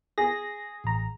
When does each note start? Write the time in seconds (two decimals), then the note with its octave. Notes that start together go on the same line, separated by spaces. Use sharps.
0.18 G#4 A#6
0.84 A1 A#5